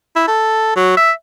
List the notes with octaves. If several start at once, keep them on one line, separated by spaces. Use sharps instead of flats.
E4
A4
F#3
E5